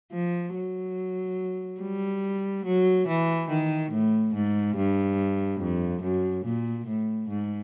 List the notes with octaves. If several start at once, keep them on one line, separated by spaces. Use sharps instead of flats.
F3
F#3
G3
F#3
E3
D#3
A2
G#2
G2
F2
F#2
A#2
A2
G#2